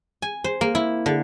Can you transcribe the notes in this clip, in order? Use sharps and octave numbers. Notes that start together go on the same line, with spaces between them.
G#5
C5
A#3
E4
D3